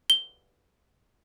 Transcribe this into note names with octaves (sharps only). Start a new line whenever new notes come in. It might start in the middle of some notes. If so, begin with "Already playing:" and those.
G7